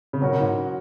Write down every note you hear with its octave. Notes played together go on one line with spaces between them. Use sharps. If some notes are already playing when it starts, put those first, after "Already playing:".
C#3
B2 F#3 C#4 F#4 A#4
C#3
G#2